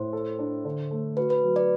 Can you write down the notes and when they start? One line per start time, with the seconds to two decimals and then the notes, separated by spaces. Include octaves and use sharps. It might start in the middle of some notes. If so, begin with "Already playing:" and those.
Already playing: A2 C5
0.13 A4
0.39 D4
0.65 D3
0.91 A3
1.17 F#4 B4
1.30 B4
1.44 F#3
1.56 B4 D5